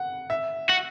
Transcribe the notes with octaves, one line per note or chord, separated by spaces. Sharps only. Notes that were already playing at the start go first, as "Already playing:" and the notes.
Already playing: F#5
E5
F#4